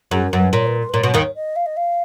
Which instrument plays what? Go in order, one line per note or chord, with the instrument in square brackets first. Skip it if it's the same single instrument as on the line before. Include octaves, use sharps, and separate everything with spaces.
[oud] F#2 [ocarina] G#4
[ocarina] A#4
[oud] F#2
[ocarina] B4
[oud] A#2 [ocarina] C#5
[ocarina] B4
A#4
B4
[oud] A#2 [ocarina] C#5
[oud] B2
D#2 D#3
[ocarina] D#5
F5
D#5
F5